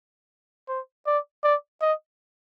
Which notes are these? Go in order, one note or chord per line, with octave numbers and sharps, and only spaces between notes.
C5
D5
D5
D#5